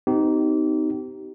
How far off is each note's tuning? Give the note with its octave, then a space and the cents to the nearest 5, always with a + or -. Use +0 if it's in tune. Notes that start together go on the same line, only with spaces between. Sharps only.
C4 -40 D#4 +0 G4 -30